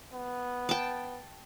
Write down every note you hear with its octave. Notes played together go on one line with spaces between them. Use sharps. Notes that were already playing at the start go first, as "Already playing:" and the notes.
B3
G5 A5